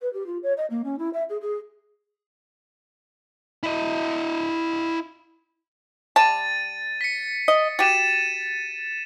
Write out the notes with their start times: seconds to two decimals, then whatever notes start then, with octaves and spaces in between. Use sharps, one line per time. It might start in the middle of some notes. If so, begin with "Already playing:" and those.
0.01 B4
0.13 G4
0.26 F4
0.43 C#5
0.57 D#5
0.70 A#3
0.84 C#4
0.98 E4
1.13 E5
1.29 G#4
1.41 G#4
3.63 E4 D#5
6.16 G3 A5 A6 D#7
7.01 B6 C#7
7.48 D#5
7.79 F#4 G4 A6 D#7 E7